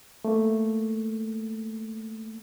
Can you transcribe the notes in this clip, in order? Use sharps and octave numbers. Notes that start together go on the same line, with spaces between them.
A3 A#3